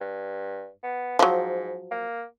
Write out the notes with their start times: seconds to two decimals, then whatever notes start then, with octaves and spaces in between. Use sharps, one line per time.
0.01 G2
0.83 B3
1.19 G#2 F3 F#3
1.91 A#3